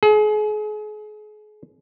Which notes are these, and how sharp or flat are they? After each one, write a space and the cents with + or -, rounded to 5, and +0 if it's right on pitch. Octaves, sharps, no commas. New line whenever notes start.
G#4 +35